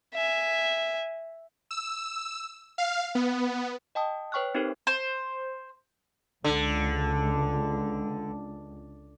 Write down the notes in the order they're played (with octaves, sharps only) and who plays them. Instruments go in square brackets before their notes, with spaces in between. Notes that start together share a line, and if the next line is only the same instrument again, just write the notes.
[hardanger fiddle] E5 G#5
[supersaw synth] E6
F5
B3
[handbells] D#5 G5 A5 D#6
B4 C#5 G5 C#6 F6 F#6
C4 D#4 G4 A4 A#4 C5
[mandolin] C5
[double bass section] C#2 [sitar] D3